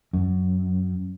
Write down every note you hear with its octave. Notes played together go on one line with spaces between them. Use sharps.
F#2